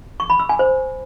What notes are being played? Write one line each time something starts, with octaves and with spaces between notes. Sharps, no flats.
C#6
B5
E6
G#5
C5